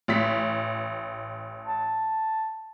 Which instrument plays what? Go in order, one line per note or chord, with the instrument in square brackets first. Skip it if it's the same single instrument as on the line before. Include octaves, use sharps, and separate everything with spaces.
[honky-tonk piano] A1 B6
[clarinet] A5